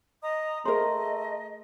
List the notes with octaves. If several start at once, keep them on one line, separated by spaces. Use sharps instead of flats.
D#5 A#5 D#6
A3 G#4 A#4 C5 D#5 A#5 C6